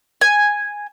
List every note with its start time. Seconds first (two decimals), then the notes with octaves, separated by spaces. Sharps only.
0.21 G#5